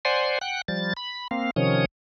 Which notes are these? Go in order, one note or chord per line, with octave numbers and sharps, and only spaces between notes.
C5 D5 F#5 G#5 C6
F#5 G5 F#6
F3 G3 A6
B5
A#3 C4 F5
C3 D#3 F3 C#4 C#5 D#6